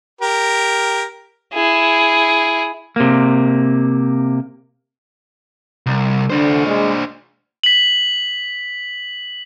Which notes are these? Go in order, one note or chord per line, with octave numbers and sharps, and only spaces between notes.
G4 A#4
E4 G#4
C3 A#3
C2
D3 D4 C5
G#3
B6 F#7